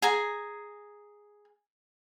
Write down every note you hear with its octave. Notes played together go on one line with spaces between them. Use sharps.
G#4 G#5 A#5